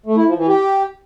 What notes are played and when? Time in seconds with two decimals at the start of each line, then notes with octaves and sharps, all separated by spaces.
0.06 A3
0.17 E4
0.27 F3
0.38 E3
0.48 G4